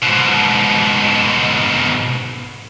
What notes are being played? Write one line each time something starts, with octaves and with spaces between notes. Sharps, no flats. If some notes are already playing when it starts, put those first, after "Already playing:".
G#2 B2